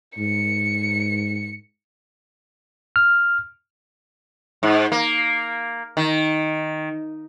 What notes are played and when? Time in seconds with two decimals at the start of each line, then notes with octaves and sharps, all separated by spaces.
0.18 G#2 C#7
2.96 F6
4.63 G#2
4.92 A#3
5.97 D#3